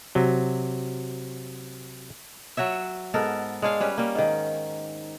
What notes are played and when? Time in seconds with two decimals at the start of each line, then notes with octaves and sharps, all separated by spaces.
0.15 C3 F#3
2.57 F#3 F#4 C#5 E5
3.14 G#2 B3 A4 A#4
3.62 G#3 D4 C#5 F5
3.80 G3 C#4 B4
3.98 G3 A#3
4.15 G#2 D#3